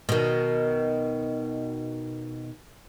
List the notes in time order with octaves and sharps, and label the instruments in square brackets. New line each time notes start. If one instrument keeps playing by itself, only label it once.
[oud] B2 D#3